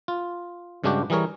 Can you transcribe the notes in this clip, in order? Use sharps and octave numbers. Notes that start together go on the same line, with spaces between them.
F4
G2 C#3 G#3 D4 F#4 G4
E3 G3 G#4 A#4 C#5